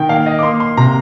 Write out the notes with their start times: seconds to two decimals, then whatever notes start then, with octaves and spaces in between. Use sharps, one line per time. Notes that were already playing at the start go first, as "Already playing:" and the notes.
Already playing: D#3 G5
0.09 A#3 F5
0.26 D#5
0.39 D6
0.43 A#3 C6
0.60 C6
0.77 C3 A#5